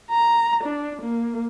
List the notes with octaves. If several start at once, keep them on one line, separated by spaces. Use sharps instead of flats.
A#5
D4
A#3